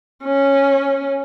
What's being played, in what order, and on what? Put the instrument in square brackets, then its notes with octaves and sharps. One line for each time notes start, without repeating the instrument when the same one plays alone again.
[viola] C#4